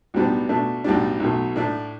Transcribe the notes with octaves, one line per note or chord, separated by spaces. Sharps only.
B1 A2 G3 B3 D4
B2 A3 D4
B1 A2 G3 D4
B1 B2 A3
A2 A3 D4